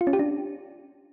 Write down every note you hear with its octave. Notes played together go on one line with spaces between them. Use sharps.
F4
C#4
G4
D4